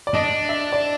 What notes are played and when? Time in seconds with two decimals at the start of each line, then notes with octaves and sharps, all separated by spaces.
0.07 D5
0.14 D4 D#5
0.49 E5
0.72 D5